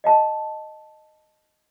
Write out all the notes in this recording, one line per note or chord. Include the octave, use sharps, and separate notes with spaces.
D#5 F5 A5